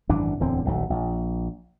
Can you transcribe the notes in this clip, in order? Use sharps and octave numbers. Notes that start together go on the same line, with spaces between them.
G#1 F#2 E3 D4
D1 E2 D3 C4
D#1 B1 A2
A#1